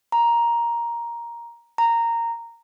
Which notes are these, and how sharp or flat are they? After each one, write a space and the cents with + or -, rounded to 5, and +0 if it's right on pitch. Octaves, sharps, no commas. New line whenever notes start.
A#5 +10
A#5 -10